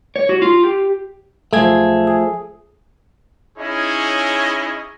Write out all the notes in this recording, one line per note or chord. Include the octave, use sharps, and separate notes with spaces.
C#5
F#4
F4
G4
B1 F3 A3 G#4 G#6
G#4
C#4 D#4 E4 G#4 C#5 D#5